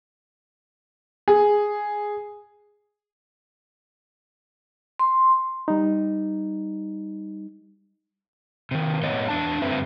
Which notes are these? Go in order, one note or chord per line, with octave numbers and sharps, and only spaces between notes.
G#4
C6
G3 D#4
C3 D#3
A2 B3 C#5 D#5
E2 D4 A5
G2 D3 A3 C4 B4 E5